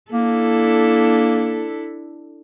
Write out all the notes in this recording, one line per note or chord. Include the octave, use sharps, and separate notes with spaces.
A#3 D4 E4 A4